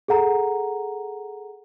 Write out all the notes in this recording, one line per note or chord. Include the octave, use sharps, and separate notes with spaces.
G#4 A4 F#5 A#5